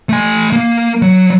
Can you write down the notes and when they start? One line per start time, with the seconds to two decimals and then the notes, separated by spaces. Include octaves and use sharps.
0.09 A3 G#5
0.53 A#3
1.02 F#3